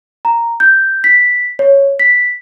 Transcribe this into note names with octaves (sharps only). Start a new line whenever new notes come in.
A#5
G6
B6
C#5
B6